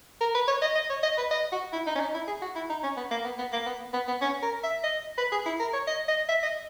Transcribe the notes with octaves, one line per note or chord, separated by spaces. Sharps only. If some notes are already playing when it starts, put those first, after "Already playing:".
A#4
B4
C#5
D#5
D#5
C#5
D#5
B4
D#5
F#4
E4
D#4
C#4
D#4
E4
G#4
F#4
E4
D#4
C#4
B3
A#3
B3
B3
A#3
B3
B3
B3
C#4
A#4
E5
D#5
B4
G#4
E4
A#4
C#5
D#5
D#5
E5
D#5